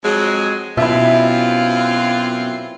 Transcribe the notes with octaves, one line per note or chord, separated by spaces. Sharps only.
F2 F#3 G#3
F#2 B2 C4 E4 F4 E5